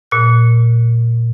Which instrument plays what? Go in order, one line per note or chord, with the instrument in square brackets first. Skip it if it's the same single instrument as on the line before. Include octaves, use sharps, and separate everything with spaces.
[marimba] A#2 F#6